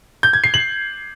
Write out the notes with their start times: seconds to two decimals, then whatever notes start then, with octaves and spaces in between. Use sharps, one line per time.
0.23 G6
0.33 G#6
0.44 C7
0.54 F#7